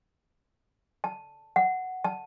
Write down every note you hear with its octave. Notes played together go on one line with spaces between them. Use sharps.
A5
F#5
A5